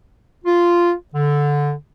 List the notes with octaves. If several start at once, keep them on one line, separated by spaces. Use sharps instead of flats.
F4
D3